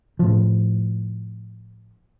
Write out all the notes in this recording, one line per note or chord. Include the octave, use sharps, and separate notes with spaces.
A2 F3